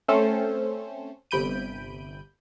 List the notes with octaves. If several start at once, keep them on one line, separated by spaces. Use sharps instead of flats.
A3 C4 C#4 A4 C5
G1 C3 B5 G6 D7 D#7